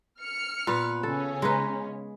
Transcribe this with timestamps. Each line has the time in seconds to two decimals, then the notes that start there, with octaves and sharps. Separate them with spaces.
0.21 F6 C#7
0.67 A#2 B3 B4
1.03 C#3 C#4 A4
1.42 G#3 D#4 B4 A#5